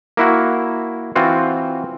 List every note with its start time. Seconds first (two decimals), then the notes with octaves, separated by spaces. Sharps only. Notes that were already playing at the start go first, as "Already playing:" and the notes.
0.17 A#3 E4 F#4
1.16 E3 C4 F4 F#4